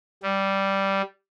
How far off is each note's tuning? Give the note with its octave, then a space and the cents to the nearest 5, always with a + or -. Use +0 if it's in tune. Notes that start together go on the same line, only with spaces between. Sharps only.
G3 -5